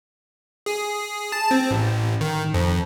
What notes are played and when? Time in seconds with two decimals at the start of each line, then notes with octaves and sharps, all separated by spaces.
0.66 G#4
1.32 A5
1.51 C4
1.71 A1
2.21 D#3
2.54 F2